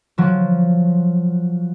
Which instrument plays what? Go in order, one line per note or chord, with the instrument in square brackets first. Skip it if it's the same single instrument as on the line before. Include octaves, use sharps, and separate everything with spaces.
[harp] F3 F#3